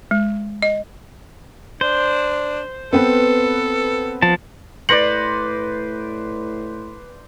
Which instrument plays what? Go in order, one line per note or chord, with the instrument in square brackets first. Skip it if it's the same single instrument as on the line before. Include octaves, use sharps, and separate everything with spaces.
[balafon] G#3
D#5
[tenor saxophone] D4 [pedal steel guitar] C5
[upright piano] B3 C4 B4 [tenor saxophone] A4
[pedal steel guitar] F3 A5
[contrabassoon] A2 [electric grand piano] B4 A#6 C#7 [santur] C5 D5 [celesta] F#7